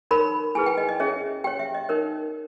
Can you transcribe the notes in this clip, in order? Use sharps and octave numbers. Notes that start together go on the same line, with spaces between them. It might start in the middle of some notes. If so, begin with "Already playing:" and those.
D#4 A#4 C#5 B5
E4 G#4 B4 G#5
G5
D#5
D#5
C#4 G#4 C#5 E5
G4 C#5 G5
E5
D#5
D#4 A#4 C#5